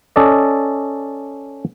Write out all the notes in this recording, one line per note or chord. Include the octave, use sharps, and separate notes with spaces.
C#4 A4 D5 D#5